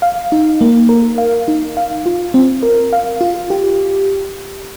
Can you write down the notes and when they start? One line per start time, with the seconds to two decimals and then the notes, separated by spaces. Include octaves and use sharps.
0.02 F5
0.32 D#4
0.61 A#3
0.89 A#4
1.18 F5
1.48 D#4
1.77 F5
2.06 F4
2.34 C4
2.63 A#4
2.93 F5
3.21 F4
3.50 G4